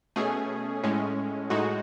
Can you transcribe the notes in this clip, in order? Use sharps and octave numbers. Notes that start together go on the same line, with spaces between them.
B2 A3 C#4 G#4
A2 G#3 C#4
A2 G#3 D#4 F#4